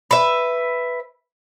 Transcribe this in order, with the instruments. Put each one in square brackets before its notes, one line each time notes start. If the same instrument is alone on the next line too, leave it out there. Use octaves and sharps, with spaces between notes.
[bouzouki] B4 E5